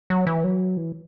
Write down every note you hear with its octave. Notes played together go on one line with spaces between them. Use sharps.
F#3
E3
F#3
E3